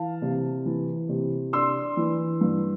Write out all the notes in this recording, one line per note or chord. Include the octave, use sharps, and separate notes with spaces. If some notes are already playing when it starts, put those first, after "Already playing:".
Already playing: E3 F5 A5
C3
E3
C3
D4 C6 E6
E3
G2